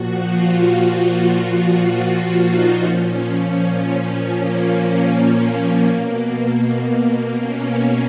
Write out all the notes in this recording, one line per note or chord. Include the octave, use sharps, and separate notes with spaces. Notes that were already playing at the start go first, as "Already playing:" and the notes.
Already playing: A#2 F3 F#4
F4
F4
D#4
A#2 F3 C#4
C#4
A#3
B2 A#3
C#4